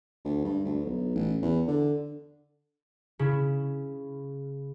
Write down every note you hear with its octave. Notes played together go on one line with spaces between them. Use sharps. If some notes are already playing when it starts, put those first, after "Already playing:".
D2
G2
D2
B1
A1
E2
D3
C#3 E4